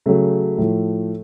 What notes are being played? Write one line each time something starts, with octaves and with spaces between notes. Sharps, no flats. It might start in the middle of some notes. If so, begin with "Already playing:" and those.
C#3 F#3 A3
A2 F3